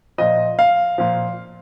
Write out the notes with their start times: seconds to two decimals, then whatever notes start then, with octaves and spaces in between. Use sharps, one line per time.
0.18 A#2 F3 D#5
0.59 F5
0.98 A#2 F3